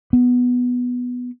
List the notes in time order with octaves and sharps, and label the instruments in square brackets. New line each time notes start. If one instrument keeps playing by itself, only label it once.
[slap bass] B3